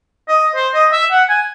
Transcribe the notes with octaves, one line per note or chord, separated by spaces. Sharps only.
D#5
C5
D#5
E5
F#5
G#5